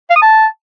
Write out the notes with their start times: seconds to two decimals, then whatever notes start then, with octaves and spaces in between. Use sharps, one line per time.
0.10 F5
0.16 D#6
0.22 A5